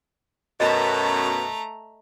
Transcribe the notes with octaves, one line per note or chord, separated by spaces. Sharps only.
F#2 B2 A3 D#5 A#5